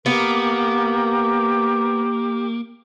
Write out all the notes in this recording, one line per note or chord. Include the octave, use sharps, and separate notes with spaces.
A#3 B3 G4 A#4